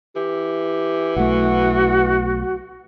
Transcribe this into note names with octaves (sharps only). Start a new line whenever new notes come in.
E3 G4
B1 A3 F#4 F#5